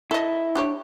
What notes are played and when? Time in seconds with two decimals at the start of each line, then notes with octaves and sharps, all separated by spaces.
0.11 E4 A4 D#5
0.55 D4 G4 C#5